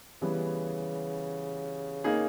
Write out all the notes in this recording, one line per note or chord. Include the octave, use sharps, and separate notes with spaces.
C#3 E3 G3 B3
A#3 D#4 G#4